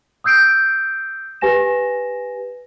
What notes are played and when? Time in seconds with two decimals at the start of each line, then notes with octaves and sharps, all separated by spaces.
0.24 D#6 E6 G6 C7 D7
1.41 G4 B4 G#5 A#6 E7